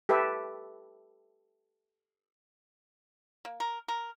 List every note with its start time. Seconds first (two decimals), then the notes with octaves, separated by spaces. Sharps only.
0.09 G4 A4 B4 E5
3.45 A#3
3.60 A#4
3.88 A#4